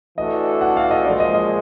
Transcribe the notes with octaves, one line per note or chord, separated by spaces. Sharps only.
E3 A3 D4 F#4 A4 D#5
F#5
F5
D#5
A#2 F3 G#3 D5
D#5
D#5